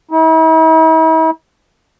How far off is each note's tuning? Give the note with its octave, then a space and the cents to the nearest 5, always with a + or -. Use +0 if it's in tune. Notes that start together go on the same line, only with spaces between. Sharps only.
E4 -45